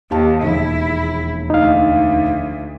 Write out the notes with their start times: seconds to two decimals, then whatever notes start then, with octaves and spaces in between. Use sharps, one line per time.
0.11 D#2 G4 F5 A5
0.43 E1 A#1 D#2 E4
1.50 D2 D#4 F5